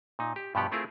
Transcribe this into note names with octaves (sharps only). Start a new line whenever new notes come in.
A#2 D#4
G4
G2 B2 F3 B3 G4 F#5
A3 C4 E4 F4 G#4 A#4